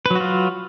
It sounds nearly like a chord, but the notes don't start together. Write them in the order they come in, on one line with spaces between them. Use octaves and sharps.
B4 F#3 F#4 F4